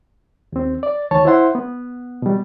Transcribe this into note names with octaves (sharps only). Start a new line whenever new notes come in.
D#2 C4
D5
D2 D#3 C#5 A5
E4 C5 E5 F#5 C6
B3
B2 G3